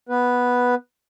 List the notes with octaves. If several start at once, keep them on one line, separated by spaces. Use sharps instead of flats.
B3 B4